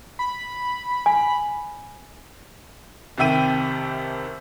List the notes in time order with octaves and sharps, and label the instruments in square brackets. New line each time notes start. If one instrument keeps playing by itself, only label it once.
[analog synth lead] B5
[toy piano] G#5
[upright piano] C2 C3 D#3 E5 G5 D#7